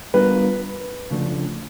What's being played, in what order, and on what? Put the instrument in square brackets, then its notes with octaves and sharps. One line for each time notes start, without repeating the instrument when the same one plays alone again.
[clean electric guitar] G3 B3 D4 F4 A#4 [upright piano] B4
[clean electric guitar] C#3 F3 A3 D4